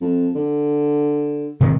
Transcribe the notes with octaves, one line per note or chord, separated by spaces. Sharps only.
F2
D3
C3 D#3 G#3